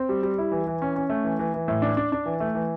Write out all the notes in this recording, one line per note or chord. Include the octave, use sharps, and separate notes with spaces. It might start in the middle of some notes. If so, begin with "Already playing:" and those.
Already playing: C4
G3
G3
E4
E3
E3
C#4
C#4
A3
E3
E3
E3
A2
D4
D4
D4
E3
A3
E3